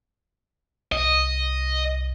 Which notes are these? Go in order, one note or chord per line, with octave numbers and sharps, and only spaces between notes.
C2 D#5